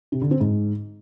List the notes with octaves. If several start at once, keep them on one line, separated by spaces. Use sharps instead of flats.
C3
D3
C4
G#2